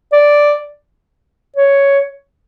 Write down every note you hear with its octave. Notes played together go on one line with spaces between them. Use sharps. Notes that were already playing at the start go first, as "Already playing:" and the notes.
D5
C#5